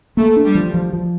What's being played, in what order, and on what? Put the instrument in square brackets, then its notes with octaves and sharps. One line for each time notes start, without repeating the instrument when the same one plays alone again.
[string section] A3 [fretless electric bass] A#3
[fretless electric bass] D4
[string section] G3
[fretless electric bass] F3
F3
F3